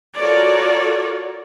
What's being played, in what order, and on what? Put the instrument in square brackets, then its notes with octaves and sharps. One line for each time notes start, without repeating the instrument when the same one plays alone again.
[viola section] F4 F#4 A4 A#4 C#5 D5